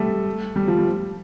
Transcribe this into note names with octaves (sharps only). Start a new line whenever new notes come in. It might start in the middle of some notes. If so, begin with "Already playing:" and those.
Already playing: G3 A3
G3
F3
G3